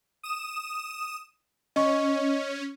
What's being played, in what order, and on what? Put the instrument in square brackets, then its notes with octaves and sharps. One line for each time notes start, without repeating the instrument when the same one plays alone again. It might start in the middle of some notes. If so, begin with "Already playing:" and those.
[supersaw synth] D#6 E7
[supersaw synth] C#4 [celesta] D#5 C#6